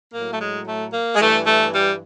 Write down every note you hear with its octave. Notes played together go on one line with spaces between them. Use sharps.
A2 F#3 A#3
A3
G#3
A3
A#3
G#3
G2 E3 A3
A3
G3